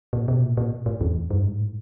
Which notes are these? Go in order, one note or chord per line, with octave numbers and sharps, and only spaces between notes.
A#2
B2
A#2
A#2
A2
E2
G2
G#2
A2